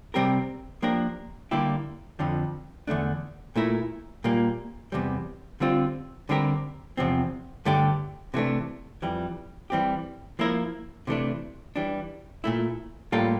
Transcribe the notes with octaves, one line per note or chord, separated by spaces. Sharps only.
C3 G3 C4 G4 A#4
F3 A#3 D4 G4 A#4
D3 G3 A#3 E4 G4
F2 D3 F3
E2 D3 A3 D4
A#2 A3 E4 A#4
A#2 G3 A#3
E2 C3 G3
D3 G3 C4 F4
D3 G3 C4 G4 A#4
E2 C3 F3 C4
G2 D3 A3 D4 G4
C3 E3 A3 D4
F2 E3 G3
E3 G3 C4 G4
F3 A#3 E4 A#4
C3 E3 A3 D4
E3 G3 D4
A#2 A3 E4
A2 G3 A#3 F4 A4